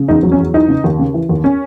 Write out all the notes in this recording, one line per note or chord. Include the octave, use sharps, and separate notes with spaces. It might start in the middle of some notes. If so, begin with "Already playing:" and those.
Already playing: C#3
E2 D#4
F#3
C#4
E2
E3 D#4
C#3
D#2
C#3
E3
D#2
C#4